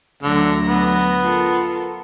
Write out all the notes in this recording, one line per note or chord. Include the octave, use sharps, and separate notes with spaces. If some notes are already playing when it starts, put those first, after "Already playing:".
D2 D3 F#3 A#6
B3
F4 A4 A#4